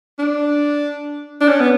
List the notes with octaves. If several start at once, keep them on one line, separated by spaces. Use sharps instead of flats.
D4
D4
C#4
B3